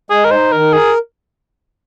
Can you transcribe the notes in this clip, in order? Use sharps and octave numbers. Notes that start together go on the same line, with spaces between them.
G#3 G#4
A#4
D#4 C5
D#3 A#4
G#4 A#4